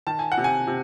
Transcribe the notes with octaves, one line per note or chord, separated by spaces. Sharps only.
D#3 A5
G#5
F#5
C3
G#5
C3